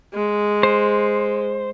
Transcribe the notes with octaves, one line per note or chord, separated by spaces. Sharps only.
G#3
C5